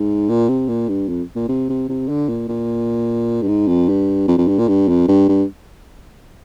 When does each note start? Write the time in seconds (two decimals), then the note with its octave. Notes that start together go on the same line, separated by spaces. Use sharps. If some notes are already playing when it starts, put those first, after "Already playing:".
Already playing: G#2
0.29 A#2
0.49 C3
0.68 A#2
0.89 G2
1.09 F2
1.35 A#2
1.49 C3
1.69 C3
1.89 C3
2.09 D3
2.29 A#2
2.48 A#2
3.42 G2
3.48 G#2
3.68 F2
3.89 G2
4.28 F2
4.38 F2
4.48 G2
4.59 A#2
4.68 G2
4.89 F2
5.08 G2
5.29 G2